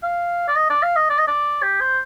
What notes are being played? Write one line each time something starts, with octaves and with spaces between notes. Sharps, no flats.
F5
D5
D#5
D5
F5
D#5
D5
D#5
D5
G4
C5